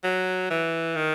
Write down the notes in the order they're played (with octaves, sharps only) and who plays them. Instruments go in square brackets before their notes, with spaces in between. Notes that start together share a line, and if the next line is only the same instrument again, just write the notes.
[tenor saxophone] F#3
E3
D#3